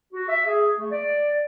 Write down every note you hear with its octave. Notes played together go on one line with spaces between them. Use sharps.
F#4
E5
G#4
A3
D5